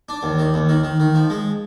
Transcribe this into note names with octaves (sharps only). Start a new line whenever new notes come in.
D4
D#2
D#3
D#2
D#3
D#3
D#3
F3
G#3